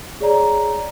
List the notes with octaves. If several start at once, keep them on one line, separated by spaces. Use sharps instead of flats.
G#4 C#5 D5 A#5